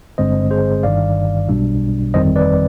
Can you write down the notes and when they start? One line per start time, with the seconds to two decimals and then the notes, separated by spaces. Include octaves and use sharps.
0.18 G1 G2 D3 G#3 C4 C5 D#5
0.51 G#4 C5
0.83 G1 G2 D#3 D5 F5
1.48 B1 B2 G3 D4
2.14 G1 F2 D#3 G3 C4 C5 D#5
2.36 B4 D5